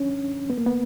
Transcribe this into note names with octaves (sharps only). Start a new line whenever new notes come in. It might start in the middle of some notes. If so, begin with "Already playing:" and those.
Already playing: C#4 D4
B3
A#3
B3